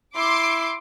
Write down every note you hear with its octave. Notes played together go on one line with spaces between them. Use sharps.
E4 C6 D6